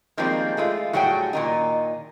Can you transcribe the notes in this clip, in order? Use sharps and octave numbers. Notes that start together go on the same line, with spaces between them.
D#3 F3 G3 G#3 A#3 C4
G#3 A3 F4
A2 F#3 G3 F#4 G#4 G5
A#2 D#3 D#4